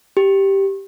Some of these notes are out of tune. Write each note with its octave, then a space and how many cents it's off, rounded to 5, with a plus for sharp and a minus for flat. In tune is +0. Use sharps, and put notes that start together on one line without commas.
G4 -5